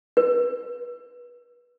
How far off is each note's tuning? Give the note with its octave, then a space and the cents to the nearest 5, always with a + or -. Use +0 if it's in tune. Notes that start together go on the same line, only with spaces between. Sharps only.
B4 -25